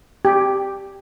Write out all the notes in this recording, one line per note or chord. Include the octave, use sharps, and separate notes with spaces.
G4